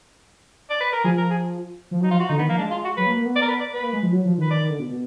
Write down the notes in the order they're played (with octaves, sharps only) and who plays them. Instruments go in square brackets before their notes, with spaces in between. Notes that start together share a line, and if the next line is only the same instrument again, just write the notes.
[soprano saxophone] D5
B4
A#4
[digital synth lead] F3 [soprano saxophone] G#4
[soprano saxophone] A#4
G#4
[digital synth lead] F3
F#3
[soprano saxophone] D#4
[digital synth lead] F3 [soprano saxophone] F4
[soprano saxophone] F#4
[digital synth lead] D3 [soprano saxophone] D#4
[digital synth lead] D#3 [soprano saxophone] B3
[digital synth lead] F3 [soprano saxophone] A#3
[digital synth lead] G#3 [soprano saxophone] D4
[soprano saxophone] F4
F#4
[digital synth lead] F#3 [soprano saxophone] B4
[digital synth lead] A#3
A#3
B3
[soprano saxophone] D5
A#4
B4
D5
[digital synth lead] B3 [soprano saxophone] B4
[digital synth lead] A#3
G#3
F3
F#3
F3
D#3
[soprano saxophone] B4
[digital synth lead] D#3 [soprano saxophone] D5
[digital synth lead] D#3
D3
B2
B2